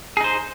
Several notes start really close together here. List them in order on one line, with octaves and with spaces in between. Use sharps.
G#4 D#4 C5